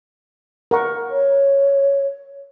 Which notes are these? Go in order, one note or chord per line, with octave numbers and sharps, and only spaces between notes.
A#4 F#5 C#6
C#5